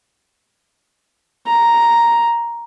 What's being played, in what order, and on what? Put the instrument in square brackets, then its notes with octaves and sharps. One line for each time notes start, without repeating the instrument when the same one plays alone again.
[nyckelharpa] A#5